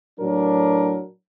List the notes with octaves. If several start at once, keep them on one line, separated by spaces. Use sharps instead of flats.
A2 F#3 D4 A#4